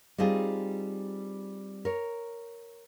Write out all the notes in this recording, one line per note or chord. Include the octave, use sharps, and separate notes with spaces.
G3 C4 D#4 F4 G#4
A#4 C#5